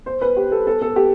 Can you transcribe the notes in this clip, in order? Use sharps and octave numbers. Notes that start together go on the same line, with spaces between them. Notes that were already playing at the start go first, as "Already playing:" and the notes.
C5
B4
G4
A4
A4
A4
G4